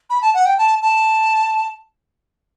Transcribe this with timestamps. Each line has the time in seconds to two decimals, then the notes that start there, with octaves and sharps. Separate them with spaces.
0.10 B5
0.22 A5
0.34 F#5
0.46 G5
0.58 A5
0.82 A5